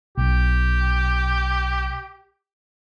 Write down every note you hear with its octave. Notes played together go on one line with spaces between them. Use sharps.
B1 G4